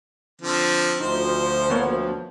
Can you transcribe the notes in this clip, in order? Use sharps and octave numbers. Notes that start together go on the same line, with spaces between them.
D3 F3 C4
D2 F3 D#4 C5
A#3 B3 C#5